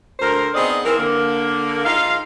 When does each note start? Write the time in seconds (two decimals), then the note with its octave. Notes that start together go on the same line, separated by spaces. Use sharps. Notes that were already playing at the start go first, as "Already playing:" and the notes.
0.20 D2 A#4 C5
0.54 B3 C4 D#4 G#4 D5 D#5
0.84 E3 C4 A#4
0.97 D3 A#3
1.85 G#2 D#4 F4 F5